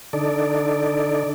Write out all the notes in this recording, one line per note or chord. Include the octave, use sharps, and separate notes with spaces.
D3 D#4 A4 D5